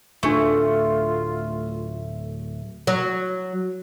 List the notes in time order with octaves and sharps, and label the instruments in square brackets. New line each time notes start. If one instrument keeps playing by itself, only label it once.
[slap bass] D1 [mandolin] A3 [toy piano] D4 C#6 [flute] F4
[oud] F#3